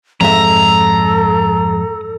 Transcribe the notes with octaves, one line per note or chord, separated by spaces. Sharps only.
F2 G#2 A4 E5 A#5